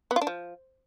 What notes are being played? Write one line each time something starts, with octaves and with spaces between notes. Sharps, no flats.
B3
F4
D4
F3